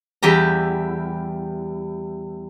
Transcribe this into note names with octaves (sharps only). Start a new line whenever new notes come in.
E2 G3 G4 A#5